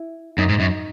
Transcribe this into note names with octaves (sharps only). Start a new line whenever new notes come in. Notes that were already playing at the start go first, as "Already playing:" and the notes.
Already playing: E4
F#2 D#4
G#2
F#2